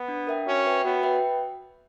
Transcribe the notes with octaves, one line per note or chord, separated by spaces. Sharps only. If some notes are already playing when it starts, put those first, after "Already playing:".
Already playing: B3
D4
A#4 E5 G5
C#4 F#4
B4 E5 G5
B3 F#4
B4 E5 G5